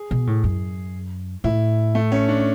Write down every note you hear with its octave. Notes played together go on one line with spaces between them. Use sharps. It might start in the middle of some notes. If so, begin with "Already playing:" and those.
Already playing: G#4
B2
A2
F#2
A2 E4
A3
C#4
D4